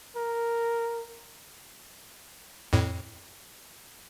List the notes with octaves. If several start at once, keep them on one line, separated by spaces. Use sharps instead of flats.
A#4
F2 A2